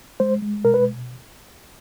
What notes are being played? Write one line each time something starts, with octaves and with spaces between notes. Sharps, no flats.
G#3 C5
G#3
B2 A#4
B4